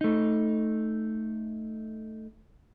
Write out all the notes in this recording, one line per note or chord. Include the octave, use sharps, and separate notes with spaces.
A3 D#4